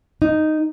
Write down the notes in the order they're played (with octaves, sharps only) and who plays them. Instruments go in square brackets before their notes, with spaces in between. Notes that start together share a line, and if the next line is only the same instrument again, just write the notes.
[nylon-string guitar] D#4